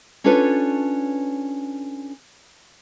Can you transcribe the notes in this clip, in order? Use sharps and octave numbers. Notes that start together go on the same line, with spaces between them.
C#4 D4 F4 A4 B4 C#5